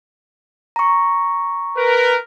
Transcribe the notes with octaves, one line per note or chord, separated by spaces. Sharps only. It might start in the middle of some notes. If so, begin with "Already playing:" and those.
A#5 C#6
A#4 B4